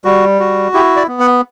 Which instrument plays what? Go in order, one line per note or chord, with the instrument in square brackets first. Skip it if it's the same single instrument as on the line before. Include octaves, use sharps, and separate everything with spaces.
[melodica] G3 F#4
F#4
E4 G4
D5
B3
F#5